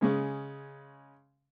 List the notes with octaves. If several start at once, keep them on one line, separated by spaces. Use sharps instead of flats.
C#3 G#3 C#4